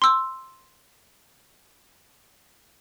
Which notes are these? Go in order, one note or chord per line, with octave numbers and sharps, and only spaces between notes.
C6 E6